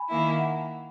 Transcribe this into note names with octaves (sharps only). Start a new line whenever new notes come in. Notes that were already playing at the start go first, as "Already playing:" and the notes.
Already playing: G#5 B5
D#3 A#3 E4
G#5
F#5 A#5